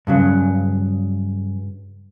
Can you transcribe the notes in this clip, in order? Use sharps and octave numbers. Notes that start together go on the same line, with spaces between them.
G2 C#3 F#3